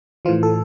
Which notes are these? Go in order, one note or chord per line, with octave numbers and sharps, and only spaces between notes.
A2 E3 F3 F4
A4